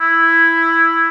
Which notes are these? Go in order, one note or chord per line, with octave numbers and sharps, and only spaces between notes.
E4